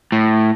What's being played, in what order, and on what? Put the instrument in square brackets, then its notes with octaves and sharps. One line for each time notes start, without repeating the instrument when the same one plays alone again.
[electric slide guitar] A2